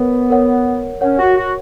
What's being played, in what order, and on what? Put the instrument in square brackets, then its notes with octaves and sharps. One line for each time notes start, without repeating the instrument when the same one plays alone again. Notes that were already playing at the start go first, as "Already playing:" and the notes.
Already playing: [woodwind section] B3 [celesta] A#4 C#5
[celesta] A#4 C#5 F#5
[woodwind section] C#4 [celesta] A#4 C#5 F#5
[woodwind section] F#4
F#4